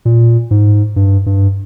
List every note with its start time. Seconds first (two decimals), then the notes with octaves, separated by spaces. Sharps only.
0.05 A#2
0.51 G#2
0.96 G2
1.26 G2